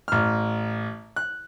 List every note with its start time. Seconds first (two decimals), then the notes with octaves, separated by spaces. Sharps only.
0.08 A1 F6
1.16 F#6